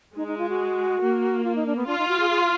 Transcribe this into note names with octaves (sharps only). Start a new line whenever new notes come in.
G#3 D#4
D#4
F4
F#4
A#3
F4
D#4
D4
B3
D4 F4
D#4
F#4
G#4
G#4